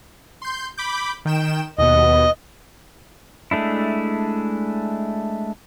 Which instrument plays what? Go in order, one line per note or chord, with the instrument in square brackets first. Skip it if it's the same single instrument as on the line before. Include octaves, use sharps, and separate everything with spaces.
[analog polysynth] C6 G6
B5 D6 G6
D#3 G5 E7
[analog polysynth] D#2 B2 B3 [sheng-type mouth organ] D#5
[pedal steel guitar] G#3 A3 D4 E4